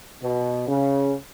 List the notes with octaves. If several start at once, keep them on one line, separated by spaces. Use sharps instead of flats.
B2
C#3